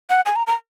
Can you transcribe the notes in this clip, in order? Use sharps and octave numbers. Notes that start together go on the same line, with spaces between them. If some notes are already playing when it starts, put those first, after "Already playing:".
F#5
G#5
A#5
A#5